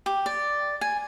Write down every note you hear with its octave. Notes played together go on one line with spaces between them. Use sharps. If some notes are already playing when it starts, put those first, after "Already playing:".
G4
D5
G#5